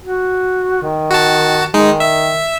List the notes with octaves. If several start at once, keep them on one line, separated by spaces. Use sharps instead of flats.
F#4
D#3
F#4 A5
D#3 G#3 D#4
E5